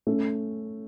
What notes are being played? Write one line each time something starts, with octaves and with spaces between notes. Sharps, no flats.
A3 C#4